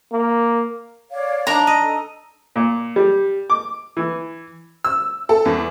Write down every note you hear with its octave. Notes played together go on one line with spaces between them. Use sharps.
A#3
C#5 D5 F5
D4 D#4 A#5
D#5
A4
A#2
G3
D6
E3
E6
A4
E2